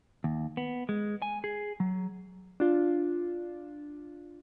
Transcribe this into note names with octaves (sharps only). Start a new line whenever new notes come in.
D#2
B3
G#3
G#5
G#4
F#3
D4 F4